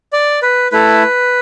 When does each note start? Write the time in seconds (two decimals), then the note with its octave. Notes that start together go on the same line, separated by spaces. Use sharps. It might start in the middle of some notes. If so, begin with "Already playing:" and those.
0.13 D5
0.42 B4
0.72 A3 E4 A4 B4